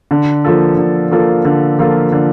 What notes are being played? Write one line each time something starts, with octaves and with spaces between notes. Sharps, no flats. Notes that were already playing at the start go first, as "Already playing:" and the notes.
D3
F3 A#3 F4 A4
D3
F3 A#3 F4 A4
D3
F3 A#3 F4 A4
D3